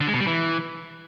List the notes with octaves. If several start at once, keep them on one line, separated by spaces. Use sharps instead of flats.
D3
G#3
B2
G3
E3